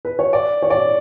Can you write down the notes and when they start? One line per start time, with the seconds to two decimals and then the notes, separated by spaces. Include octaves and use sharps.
0.05 B4
0.19 C#5
0.33 D5
0.62 C#5
0.70 D5